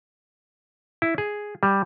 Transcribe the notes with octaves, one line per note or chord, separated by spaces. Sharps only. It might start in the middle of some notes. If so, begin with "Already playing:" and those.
E4
G#4
G3